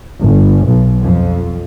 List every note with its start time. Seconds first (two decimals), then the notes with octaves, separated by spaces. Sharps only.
0.20 G1
0.67 B1
1.02 F2